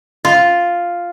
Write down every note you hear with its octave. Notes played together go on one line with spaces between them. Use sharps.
F4